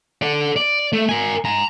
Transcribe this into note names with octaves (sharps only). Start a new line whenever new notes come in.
A4 D5
D5
A3
A#4 G#5
G#5 A#5